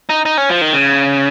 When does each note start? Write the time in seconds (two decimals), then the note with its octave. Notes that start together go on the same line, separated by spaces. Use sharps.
0.09 D#4
0.25 D#4
0.38 C#4
0.50 F3
0.61 D#3
0.73 C#3